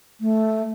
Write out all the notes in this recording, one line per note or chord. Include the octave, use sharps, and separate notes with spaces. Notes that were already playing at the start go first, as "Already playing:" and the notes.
A3